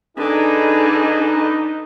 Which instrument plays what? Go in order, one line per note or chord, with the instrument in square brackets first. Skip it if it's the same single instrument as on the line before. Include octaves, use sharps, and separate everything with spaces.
[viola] D3 [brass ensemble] D#4 [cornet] G#4 [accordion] B4 D#5